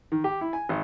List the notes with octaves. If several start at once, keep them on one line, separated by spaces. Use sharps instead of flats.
D#3
G4
E4
G#5
G#1